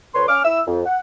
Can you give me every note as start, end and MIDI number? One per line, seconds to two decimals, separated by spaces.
0.15 0.25 38
0.15 0.25 71
0.15 0.25 73
0.15 0.25 84
0.28 0.41 61
0.28 0.41 86
0.28 0.41 89
0.45 0.61 64
0.45 0.61 88
0.67 0.81 41
0.86 0.99 78